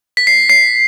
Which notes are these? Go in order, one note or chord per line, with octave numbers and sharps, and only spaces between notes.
B6
C7
C7